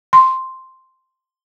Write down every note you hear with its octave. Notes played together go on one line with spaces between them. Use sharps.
C6